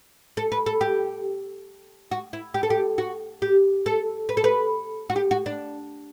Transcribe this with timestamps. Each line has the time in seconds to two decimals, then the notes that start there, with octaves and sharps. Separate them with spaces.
0.37 A4
0.52 B4
0.66 A4
0.81 G4
2.11 F#4
2.33 E4
2.54 G4
2.63 A4
2.70 G4
2.98 F#4
3.42 G4
3.86 A4
4.29 B4
4.37 A4
4.44 B4
5.10 F#4
5.16 G4
5.31 F#4
5.46 D4